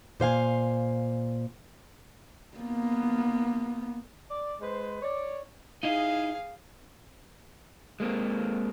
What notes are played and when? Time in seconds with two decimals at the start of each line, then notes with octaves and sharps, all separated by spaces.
0.20 A#2 C5 F5 G#5
2.57 A#3 B3
4.31 D5
4.62 G#3 B4 C5
5.02 C#5 D5
5.83 D#4 E4 G#4 D#5 F5
8.00 G#3 A#3 C4